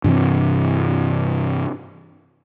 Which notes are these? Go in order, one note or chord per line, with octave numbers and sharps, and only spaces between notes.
G2 C3 E3 C4